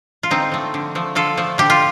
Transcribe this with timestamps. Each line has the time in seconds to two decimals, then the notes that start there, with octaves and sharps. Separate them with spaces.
0.23 F4
0.30 D3 C4 D#4
0.52 F3 A3
0.74 D3
0.95 F3 A3
1.15 D3 F4 A4
1.37 F3 A3
1.58 D3 G4
1.70 F4